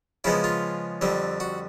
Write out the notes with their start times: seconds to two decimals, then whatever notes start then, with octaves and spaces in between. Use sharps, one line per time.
0.24 C#3 F3 G#3 B3 E4
0.44 F4
1.01 F2 D3 G3 C4
1.40 F#4